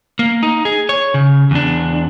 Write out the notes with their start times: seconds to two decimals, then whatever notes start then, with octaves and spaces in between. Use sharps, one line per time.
0.19 A#3
0.43 D#4
0.65 G#4
0.89 C#5
1.14 C#3
1.51 E2 D4